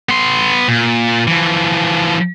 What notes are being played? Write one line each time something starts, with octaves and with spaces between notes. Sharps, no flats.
B3 C6
A#2
E3 F3